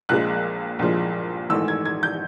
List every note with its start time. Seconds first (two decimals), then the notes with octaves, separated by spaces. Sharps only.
0.09 A#1 A#2 F3 G#3 F#6
0.79 A#1 A#2 F3 G#3
1.50 G#1 G#2 E3 A3 E6
1.68 G#6
1.85 G#6
2.03 G6